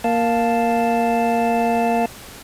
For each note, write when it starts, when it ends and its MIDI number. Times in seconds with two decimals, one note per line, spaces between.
0.04 2.06 58
0.04 2.06 77
0.04 2.06 81